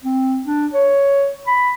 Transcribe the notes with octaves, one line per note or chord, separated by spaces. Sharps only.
C4
D4
C#5
B5